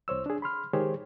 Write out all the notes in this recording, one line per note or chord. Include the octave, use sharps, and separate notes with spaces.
C2 C5 C#5 E6
D4 G#4
B5 C6 F6
D#3 G#3 G4 G#4 C5 C#5